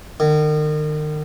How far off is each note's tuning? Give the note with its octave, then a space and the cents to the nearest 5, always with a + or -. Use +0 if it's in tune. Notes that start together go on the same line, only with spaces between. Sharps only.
D#3 -40